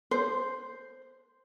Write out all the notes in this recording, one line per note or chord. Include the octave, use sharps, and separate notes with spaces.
C5